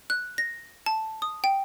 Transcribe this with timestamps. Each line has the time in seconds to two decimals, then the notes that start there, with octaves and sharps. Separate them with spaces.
0.10 F#6
0.38 A#6
0.86 A5
1.22 D#6
1.44 G5